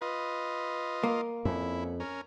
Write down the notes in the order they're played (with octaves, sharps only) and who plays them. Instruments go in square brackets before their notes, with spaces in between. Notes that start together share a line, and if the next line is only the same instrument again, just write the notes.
[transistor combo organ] F4 D#5 [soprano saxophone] B4
[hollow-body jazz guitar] A#3
[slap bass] F2 [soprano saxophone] C#4 [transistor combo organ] E4
[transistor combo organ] C#4 A#4